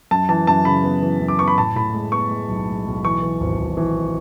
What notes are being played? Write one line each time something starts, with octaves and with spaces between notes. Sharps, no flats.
F#2 A5
E3 A5
F#2 A5
C#3 B5
B3
E3
F#2
D6
B3 C#6
B5
A2 A5
A2 B5
G#3
B3 C#6
G#3
B1
G#3
B1
E3 C#6
E3
G#1
G#1
E3